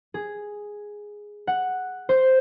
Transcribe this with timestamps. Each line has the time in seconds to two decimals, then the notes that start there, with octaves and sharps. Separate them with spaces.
0.14 G#4
1.47 F#5
2.09 C5